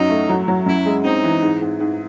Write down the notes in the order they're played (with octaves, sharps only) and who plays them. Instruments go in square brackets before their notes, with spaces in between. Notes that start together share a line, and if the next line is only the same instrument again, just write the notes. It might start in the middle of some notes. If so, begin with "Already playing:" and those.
Already playing: [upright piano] F#2 F#3 [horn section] D#4
[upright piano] A3
F#3
F#3
[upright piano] F#2 [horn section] E4
[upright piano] G#3
[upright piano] C4 [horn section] D#4
[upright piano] E3
G#2
G#2
G#2